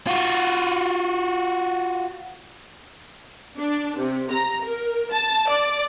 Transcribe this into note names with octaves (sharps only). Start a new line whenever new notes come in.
F4 F#4
D4
C3
A#5
A#4
A5
D5